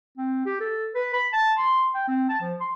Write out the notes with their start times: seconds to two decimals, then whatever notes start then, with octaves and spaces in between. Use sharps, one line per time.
0.18 C4
0.45 G4
0.60 A4
0.95 B4
1.13 B5
1.33 A5
1.58 C6
1.94 G5
2.08 C4
2.29 A5
2.41 F3
2.60 C6